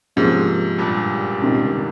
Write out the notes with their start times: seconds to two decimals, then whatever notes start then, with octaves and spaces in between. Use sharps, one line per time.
0.16 G#2 C3 F3 A#3 C#4 G#4
0.79 G2 A#2
1.41 C#2 C3 D#3